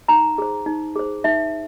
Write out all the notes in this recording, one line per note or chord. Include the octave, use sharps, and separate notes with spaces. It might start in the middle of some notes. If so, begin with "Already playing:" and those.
D#4 A#5
G#4 C5
D#4
G#4 C5
D#4 E5